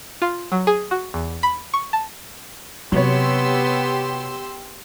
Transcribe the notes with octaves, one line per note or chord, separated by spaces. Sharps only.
F4
F#3
G#4
F#4
E2
B5
C#6
A5
C3 F#3 B3 G4 C#5 C6 E6